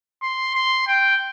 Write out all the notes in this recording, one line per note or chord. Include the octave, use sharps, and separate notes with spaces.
C6
C6
G5